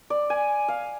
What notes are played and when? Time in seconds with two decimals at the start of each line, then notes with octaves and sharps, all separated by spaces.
0.10 D5
0.30 G#5
0.68 F5